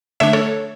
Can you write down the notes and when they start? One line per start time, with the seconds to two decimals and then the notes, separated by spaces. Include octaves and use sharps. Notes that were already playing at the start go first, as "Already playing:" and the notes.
0.20 D3 A3 D4 C#5 E5
0.33 A4 C#5